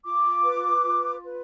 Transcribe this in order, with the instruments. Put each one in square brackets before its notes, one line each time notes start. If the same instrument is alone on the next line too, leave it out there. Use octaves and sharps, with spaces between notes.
[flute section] F4 D6
B4
F4
B4